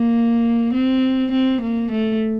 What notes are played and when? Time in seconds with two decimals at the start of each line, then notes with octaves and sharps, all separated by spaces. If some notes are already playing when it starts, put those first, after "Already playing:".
Already playing: A#3
0.73 C4
1.32 C4
1.61 A#3
1.91 A3